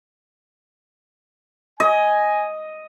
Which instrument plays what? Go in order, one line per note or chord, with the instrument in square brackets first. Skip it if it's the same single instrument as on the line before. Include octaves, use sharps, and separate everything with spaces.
[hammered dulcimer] D#5 [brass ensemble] G#5